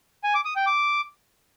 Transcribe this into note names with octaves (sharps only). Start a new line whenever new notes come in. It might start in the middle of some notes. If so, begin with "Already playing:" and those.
G#5
D6
D#6
G5
D6